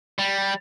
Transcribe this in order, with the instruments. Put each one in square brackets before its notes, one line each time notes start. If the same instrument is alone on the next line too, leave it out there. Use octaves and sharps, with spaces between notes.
[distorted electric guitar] G3